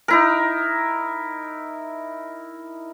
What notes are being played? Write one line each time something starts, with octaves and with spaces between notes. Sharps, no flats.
D#4 E4 A#4